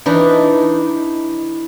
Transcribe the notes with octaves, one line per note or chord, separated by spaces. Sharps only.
E3 D4 D#4